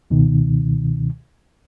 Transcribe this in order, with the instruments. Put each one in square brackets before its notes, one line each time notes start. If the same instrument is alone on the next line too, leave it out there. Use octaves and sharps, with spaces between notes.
[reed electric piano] C#2 B2 D#3